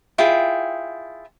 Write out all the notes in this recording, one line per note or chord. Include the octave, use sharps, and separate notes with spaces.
E4 F4 G#4 G5